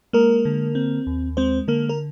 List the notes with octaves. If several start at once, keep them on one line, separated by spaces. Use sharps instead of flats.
G#3 A#3 A#4
D3
C4
D#2
G#3 C4 C5
D3 A#3 A#4
A#4